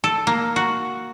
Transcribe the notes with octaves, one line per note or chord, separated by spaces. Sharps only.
A4
A#3
F#4